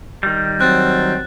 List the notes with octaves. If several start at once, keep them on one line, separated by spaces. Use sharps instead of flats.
D#3 G3
F#3 C4 F#6 A6